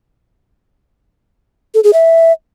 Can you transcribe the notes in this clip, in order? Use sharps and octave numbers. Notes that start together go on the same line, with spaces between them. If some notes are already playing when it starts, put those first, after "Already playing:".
A4
G#4
E5